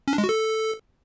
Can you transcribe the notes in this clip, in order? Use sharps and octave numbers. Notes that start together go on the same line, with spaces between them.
C#4
D4
G#3
F#4
A4